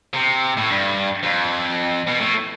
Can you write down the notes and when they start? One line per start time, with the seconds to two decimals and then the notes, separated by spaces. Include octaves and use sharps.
0.14 C3
0.57 A2
0.70 G2
1.23 F2
2.07 B2
2.21 A2